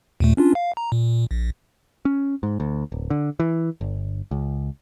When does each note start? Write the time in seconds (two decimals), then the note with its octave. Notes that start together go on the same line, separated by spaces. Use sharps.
0.20 D#2 A#2 A3
0.37 C#4 D4 F4
0.55 F5
0.77 A#5
0.92 A#2
1.31 A#1
2.05 C#4
2.43 G#2
2.60 D2
2.92 D1
3.10 D3
3.40 E3
3.81 G1
4.31 C#2